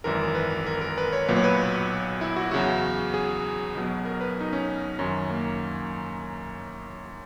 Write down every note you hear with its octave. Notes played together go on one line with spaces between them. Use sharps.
G#1 F#2 E3 A#4
B4
A#4
A#4
B4
C#5
B1 A#2 F#3 B4
C#5
B4
E4
F#4
E2 C#3 F#3 F#4
G#4
B1 B2 F#3
A#4
B4
D#4
C#4
F#2 D#3 F#3 C#4
A#3